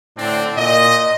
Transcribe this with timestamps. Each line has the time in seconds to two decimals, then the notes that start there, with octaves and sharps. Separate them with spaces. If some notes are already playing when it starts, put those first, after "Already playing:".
0.17 A2 D3 C4 D4
0.57 A#2 D#5